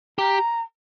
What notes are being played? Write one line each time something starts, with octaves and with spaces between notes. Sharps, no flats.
G4 A#5